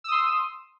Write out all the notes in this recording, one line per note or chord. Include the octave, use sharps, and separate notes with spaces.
C6 D#6 E6